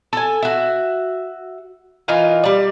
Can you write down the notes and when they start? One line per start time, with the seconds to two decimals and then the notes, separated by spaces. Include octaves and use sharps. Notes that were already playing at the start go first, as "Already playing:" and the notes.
0.13 A4 G#5
0.42 F#4 E5
2.08 E3 D#4 F4 A#4
2.44 G3 D5